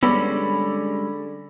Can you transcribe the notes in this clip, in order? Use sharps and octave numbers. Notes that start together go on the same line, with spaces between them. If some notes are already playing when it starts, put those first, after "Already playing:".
D3 G3 G#3 B3 C#4 D5 B5 E6